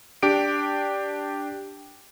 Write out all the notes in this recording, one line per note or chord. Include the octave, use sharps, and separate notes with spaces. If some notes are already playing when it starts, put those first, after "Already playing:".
D4 G4 D7